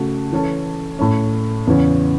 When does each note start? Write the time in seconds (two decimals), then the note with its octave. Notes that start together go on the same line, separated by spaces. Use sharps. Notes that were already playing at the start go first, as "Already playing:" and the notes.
Already playing: C#3 A3 F#4 A4
0.32 E3 C#4 A4
0.99 A2 A3 C#4
1.67 E2 C#3 E3 C#4